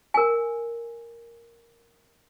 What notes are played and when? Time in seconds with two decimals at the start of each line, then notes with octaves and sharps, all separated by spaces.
0.14 A#4 G#5